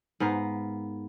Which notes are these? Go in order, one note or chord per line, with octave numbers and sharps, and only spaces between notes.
G#2 B3 A#4 F5